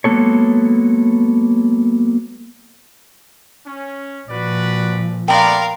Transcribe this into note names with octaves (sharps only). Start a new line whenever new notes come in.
F#3 G#3 A#3 B3 A4 C#5
C#4
A#2 F3 F#4 B4 D5
A3 B3 A#4 D5 F5 G5 B5 C6